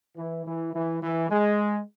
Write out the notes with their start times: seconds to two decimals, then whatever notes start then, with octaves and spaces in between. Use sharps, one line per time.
0.17 E3
0.45 E3
0.73 E3
1.02 E3
1.30 G#3